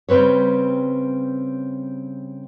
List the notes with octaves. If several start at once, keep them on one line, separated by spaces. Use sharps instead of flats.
C#3 G3 C4 B4 C#5